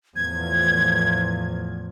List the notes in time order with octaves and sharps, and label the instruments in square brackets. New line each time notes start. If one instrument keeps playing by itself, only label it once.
[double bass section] E2 A2 F3 [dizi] G#6